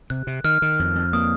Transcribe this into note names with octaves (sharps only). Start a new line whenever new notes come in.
C3 F#6
C3
D#3 F6
D#3
F2
F2
A#3 D#6